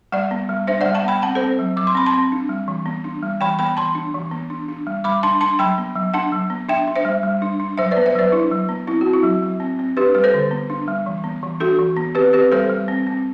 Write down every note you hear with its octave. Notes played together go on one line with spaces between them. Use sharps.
G3 D5 F#5
B3
G3
D4 C5 E5
G3 D5 F#5
F#5 A5
B3 G5 B5
C4 F#5 A5
A4 C5
C4
F#3
F#3 D6
C6
C4 B5
A5 C6
C4
D4
G3
E3
B3
D4
G3
E3 G5 B5
B3 G5 B5
E3 A5 C6
D4
E3
B3
D4
D4
G3
G3 B5 D6
D4 A5 C6
D4 A5 C6
F#3 G5 B5
B3
F#3
D4 F#5 A5
F#3
B3
D4 E5 G5
D4
C5 E5
G3
G3
D4
D4
F#3 C5 E5
B4 D5
B3
C5 E5
F#3 B4 D5
D4 E4
F#3
B3
C4 E4
F#4
C4
E4
F#3
F#3
C4
C4
D4 G4 B4
G3 B4
A4 C5
D3
B3
D4
G3
E3
B3
E3
D4 F#4 A4
E3
B3
C4 G4 B4
C4 G4 B4
G3 A4 C5
G3
C4
C4